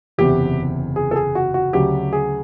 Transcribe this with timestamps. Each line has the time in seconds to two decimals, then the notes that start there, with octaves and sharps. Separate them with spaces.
0.18 F#1 E2 C3 G4
0.96 G#4
1.11 A4
1.16 G#4
1.35 F#4
1.54 F#4
1.73 D2 C#3 F#3 G4
2.13 G#4